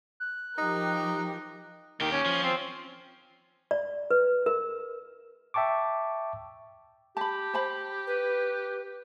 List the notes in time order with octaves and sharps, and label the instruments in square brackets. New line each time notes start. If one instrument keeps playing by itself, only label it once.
[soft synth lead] F#6
[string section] F3 G4 A#4 [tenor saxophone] D#4
[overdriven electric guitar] D#2 G4 [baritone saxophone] D#3
[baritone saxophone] C#4
[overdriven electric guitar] F3
[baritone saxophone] C4
[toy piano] D5
B4
A#4
[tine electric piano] E5 G5 A5 C#6 D6
[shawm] G4 [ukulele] A5 B5
[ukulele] C5 A5 B5
[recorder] B4